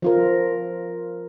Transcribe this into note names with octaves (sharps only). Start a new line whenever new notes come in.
F3 F4 A#4